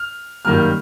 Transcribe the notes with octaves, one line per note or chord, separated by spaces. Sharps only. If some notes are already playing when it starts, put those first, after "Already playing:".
Already playing: F6
F#2 D#3 G3 A#3 F6